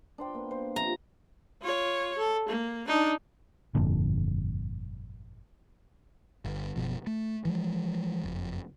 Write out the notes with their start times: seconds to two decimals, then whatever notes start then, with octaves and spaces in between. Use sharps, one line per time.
0.18 D4 C5 G5
0.34 A#3 B3
0.51 C5
0.76 C3 F3 A#5
1.62 F4 C#5
2.18 A4
2.48 A#3
2.88 D4 D#4
3.75 G1 F2 A#2 D3
6.45 G1
6.76 F#1 B2 F3
7.07 A3
7.45 E3 F3 G#3
8.24 F#1 F2